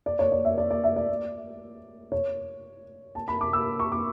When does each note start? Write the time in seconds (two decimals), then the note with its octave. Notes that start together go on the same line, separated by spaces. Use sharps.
0.06 D5
0.19 C#5
0.32 D5
0.45 E5
0.58 D5
0.70 D5
0.84 E5
0.96 D5
2.12 C#5
3.15 A5
3.28 B5
3.41 D6
3.53 E6
3.80 C#6
3.92 D6